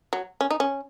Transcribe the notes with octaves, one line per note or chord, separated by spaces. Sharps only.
F#3
C#4
D#4
C#4